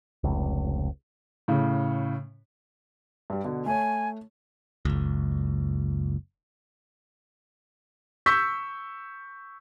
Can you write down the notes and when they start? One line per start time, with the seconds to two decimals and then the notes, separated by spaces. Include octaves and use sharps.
0.24 F1 C#2
1.48 A2 C#3
3.30 G2 G3
3.44 B2 D3
3.66 A3 C#5 G#5
4.85 F#1 C#2
8.26 C#6 E6 G6 B6